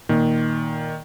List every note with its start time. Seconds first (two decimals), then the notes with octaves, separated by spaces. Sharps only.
0.09 A#2 D#3